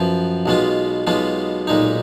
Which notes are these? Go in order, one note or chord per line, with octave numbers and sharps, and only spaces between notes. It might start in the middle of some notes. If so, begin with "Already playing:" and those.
Already playing: F#2 F3 B3
B1 B2 G#3 B3 F4
B1 B2 G#3 B3 F4
B1 A#2 G#3 D#4